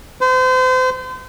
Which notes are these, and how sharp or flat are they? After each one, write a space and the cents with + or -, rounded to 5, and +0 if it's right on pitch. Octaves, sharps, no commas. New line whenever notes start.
C5 -35